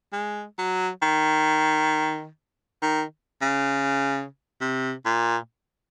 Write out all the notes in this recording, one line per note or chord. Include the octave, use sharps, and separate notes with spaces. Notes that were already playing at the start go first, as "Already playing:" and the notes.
G#3
F#3
D#3
D#3
C#3
C3
A#2